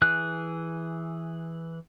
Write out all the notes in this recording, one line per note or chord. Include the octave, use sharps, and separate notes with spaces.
E3 G#4 F#6